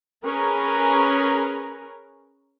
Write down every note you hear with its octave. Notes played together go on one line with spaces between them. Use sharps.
C#4 G#4 A#4 B4 A#5